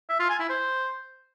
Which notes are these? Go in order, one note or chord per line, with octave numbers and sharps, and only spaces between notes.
E5
F4
G#5
E4
C5